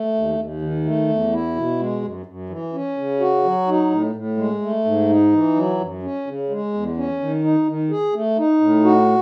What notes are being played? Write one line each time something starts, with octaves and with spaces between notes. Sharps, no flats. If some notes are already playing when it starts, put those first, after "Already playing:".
Already playing: A3
D#2
D#2
D#3
A3
E2
E4
B2
G#3
F#2
F#2
E3
C#4
C#3
F#4
F#3
D#4
A2
A2
G#3
A3
G#2
D#4
E3
F#3
F#2
C#4
C#3
G#3
E2
C#4
D#3
D#4
D#3
G#4
A3
D#4
A2
F#4